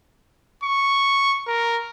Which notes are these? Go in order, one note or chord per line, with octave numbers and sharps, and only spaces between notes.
C#6
A#4